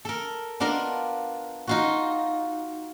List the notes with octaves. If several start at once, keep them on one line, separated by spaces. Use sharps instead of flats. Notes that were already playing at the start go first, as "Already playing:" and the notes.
A4 A#4
B3 D4 F4 A#4 D#5
D#4 F4 F#4